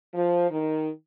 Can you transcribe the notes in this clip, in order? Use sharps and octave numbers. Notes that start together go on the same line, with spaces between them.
F3
D#3